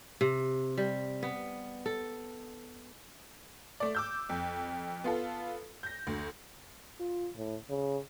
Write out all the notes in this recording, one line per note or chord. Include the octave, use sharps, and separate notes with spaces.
C3
G3
B3
A4
A3 D5
D6 E6 G6
F2
B3 F4 A4
G6 A#6
D2
F4
A2
C#3